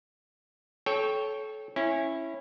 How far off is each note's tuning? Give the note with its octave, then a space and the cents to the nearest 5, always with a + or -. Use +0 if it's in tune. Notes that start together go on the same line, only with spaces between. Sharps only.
A4 -30 C#5 +0 G5 +5
C#4 -20 E4 +0